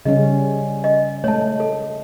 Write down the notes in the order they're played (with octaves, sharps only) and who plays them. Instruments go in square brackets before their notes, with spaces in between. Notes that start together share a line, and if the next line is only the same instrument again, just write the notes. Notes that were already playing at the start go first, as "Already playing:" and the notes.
[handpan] C#3 G3 C#4 [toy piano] D#5
[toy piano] D#5
[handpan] G#3 A3 [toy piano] C#5 A5
[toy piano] A4